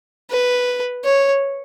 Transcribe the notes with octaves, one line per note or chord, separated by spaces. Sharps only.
B4
C#5